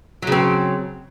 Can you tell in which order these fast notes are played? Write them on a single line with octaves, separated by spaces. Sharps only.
F#3 C#3 C4